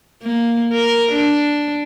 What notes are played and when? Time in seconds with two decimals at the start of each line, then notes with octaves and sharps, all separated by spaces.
0.23 A#3
0.73 A#4
1.12 D4